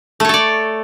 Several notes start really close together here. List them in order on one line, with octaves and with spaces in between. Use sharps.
A3 C#5 A4 D5